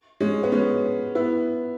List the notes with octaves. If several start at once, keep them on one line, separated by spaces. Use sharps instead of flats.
G#3 C#4
B3
G#3 C#4
B3 E4